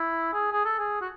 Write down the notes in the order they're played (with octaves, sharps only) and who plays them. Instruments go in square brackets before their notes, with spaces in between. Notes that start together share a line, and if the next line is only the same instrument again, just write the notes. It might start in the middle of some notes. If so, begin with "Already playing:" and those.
Already playing: [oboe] E4
G#4
G#4
A4
G#4
F#4